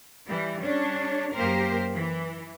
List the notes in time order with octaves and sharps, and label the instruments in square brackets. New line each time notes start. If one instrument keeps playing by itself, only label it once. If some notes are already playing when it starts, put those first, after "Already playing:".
[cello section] E3 G3
G3 C#4 D4 C#5
F#2 A#3 G4 A#4 C5
E3